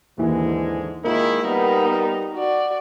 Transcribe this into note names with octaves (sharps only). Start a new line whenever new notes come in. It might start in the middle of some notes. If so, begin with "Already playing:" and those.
D#2 G#2 D3 E3 G#3
D#3 G#3 A#3 E4 F4
G3 B3 D#4 A#4
F#4 D5